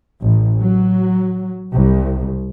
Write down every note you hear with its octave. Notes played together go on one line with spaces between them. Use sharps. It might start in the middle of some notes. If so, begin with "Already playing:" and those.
A1
F#3
C2